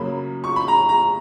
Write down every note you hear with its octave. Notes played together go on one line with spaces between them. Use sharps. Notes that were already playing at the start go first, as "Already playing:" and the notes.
Already playing: F#2 C#3 F#3 A#3 B5
C#6
B5
A#5
A#5